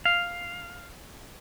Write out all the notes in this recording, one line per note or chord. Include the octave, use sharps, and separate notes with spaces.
F5